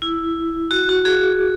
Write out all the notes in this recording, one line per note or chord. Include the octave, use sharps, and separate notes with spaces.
E4
F#4
F#4
G#4